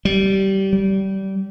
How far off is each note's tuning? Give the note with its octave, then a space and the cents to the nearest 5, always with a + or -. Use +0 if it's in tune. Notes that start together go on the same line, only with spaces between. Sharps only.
G3 -20
G3 -25